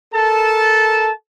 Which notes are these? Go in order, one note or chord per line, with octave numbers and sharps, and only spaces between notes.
A4 A#4 A5